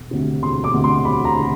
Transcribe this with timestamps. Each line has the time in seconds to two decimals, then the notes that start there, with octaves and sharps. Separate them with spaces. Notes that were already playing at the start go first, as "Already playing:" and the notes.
Already playing: E1
0.11 D2 C3
0.42 E1 C6
0.64 D6
0.74 D2 C3
0.84 C6
1.04 E1 B5
1.25 A#5
1.40 C3